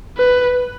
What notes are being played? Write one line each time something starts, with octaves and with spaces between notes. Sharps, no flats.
B4